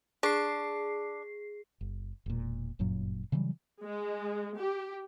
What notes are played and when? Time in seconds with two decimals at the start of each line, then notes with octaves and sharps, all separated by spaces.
0.23 D4 G#4 C7
1.81 F#1
2.26 E1 A#2
2.79 G1 F#2 A#2 F#3
3.32 C#3 E3 F#3 G3
3.83 G#3
4.58 G4